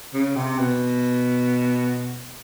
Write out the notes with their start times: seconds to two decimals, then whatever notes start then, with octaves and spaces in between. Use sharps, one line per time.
0.14 C#3
0.36 C3
0.58 B2